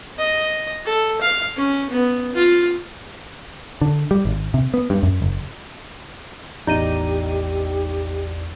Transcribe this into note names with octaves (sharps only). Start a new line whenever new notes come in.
D#5
A4
F5
C#4
B3
F4
D3
G3
G#1
C3
B3
G2
F#2
F#1
A1 E2 D#4 G4 D5 D#5 D#7